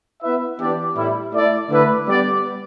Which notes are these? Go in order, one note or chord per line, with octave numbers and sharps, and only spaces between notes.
B3 E4 B4 E5
E3 B3 D4 G4 D5
A2 G3 E4
A3 E4 A4 D5
D3 A3 E4 B4 D5
G3 B3 G4 D5